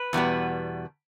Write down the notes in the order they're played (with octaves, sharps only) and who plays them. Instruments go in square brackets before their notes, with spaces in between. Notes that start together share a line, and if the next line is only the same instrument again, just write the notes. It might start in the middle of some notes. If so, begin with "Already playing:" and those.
Already playing: [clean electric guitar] B4
[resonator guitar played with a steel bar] E2 B2 G3 B3